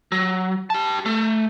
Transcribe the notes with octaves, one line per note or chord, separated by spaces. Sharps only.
F#3
G4 A5
A3